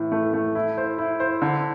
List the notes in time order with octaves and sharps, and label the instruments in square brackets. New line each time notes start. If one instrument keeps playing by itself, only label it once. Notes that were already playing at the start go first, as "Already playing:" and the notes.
Already playing: [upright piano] A2 E3
A3
A3
E4
C5
E4
C5
D3